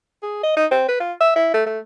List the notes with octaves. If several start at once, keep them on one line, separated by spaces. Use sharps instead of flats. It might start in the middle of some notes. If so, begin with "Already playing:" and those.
G#4
D#5
D#4
C4
B4
F4
E5
E4
A3
A3